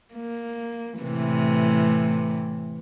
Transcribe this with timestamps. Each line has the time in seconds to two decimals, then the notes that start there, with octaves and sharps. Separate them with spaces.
0.14 A#3
1.01 A2 C3 E3